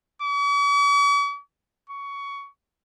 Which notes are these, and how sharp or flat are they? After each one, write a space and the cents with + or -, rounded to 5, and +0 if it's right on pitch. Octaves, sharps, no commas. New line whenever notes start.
C#6 +45
C#6 +20